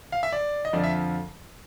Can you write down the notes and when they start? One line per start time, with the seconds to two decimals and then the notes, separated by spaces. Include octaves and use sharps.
0.12 F5
0.23 E5
0.33 D5
0.65 D#5
0.73 F2 D3 F3 D5
0.84 E5